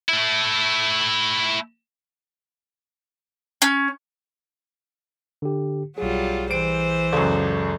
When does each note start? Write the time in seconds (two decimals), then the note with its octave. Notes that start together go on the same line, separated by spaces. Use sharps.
0.09 A3 E4
3.62 C#4
5.42 D3 G4
5.98 B1 F#3 G3 F4 G#4
6.51 E3 C5 D7
7.13 C#2 F#2 A4 D5